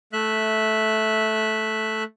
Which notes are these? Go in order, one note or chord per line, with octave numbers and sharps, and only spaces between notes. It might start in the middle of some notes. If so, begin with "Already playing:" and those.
A3 E5 F#6